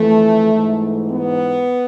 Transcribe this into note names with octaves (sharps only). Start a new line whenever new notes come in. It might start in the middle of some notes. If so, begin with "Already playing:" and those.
Already playing: F2 E3 A3
G#2 E3
B3